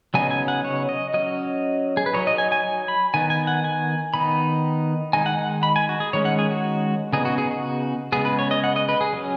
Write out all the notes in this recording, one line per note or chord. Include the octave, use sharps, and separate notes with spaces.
C#3 F#3 B3 D#4 G#5
G#5
F#5
C#5
D#5
F#3 C#4 D#5
G#4
B4
F#3 D#4 C#5
D#5
G#5
G#5
G#5
B5
D#3 B3 D#4 G#5
G#5
F#5
G#5
D#3 B3 D#4 B5
D#3 G#3 D#4 G#5
F#5
F#5
B5
G#5
F#4
G#4
D#3 G#3 C#4 C#5
F#5
G#4
F#4
C#3 B3 D#4 G#4
F#4
G#4
F#4
C#3 G#3 B3 G#4
B4
C#5
D#5
F#5
D#5
B4
G#4
F#3 C#4